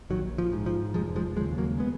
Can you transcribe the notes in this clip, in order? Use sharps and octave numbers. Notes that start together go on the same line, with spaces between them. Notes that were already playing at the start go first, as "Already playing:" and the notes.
A#1 D#3 F#3
F3
G#2
F3
F1 F3 G#3
F3 G#3
D#2 C#3 F3 G#3
F#3 A#3
G#3 B3